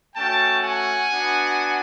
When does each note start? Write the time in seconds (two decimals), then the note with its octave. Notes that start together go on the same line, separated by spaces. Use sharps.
0.15 A3 C#4 F#4 G5 A5
0.63 F#5 G#5
1.12 B3 D4 F#4